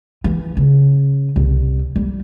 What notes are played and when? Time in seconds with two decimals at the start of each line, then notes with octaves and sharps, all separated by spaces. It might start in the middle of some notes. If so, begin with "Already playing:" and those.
0.24 E3
0.57 C#3
1.36 C2
1.96 G3